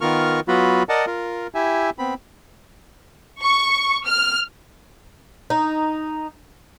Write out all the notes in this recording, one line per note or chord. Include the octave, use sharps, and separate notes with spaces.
D#3 B3 F4 A#4 C#6 F6
F#3 B3 F4 F#4 B5
A#4 D5 D#5 F#5 A5
F4 A#4
E4 G4 E5 G#5
B3 C4 B5
C#6
F6
D#4